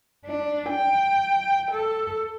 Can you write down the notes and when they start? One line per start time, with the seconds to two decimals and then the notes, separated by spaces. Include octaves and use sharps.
0.26 D4
0.70 G5
1.72 A4